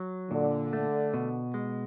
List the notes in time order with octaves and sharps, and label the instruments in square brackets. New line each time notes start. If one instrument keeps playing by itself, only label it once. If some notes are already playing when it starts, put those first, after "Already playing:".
Already playing: [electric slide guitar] F#3
[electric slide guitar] A#2 [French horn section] D3
[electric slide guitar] A3
B2
G#3